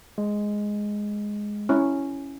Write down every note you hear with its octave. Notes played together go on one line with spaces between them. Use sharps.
G#3
C#4 E4